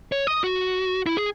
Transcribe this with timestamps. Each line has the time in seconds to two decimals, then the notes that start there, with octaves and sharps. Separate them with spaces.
0.12 C#5
0.27 D#5
0.44 F#4
1.06 E4
1.17 G#4